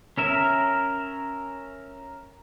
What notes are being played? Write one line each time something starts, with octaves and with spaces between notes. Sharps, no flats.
C#4 A#4 E5